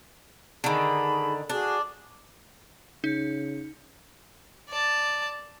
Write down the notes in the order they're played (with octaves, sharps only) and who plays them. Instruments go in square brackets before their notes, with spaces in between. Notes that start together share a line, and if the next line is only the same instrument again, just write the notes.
[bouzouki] D3 D#3 [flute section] D#4 G#4 B5
[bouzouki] D4 [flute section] F#4 G#4
[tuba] C#3 [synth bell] D#4
[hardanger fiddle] D5 A5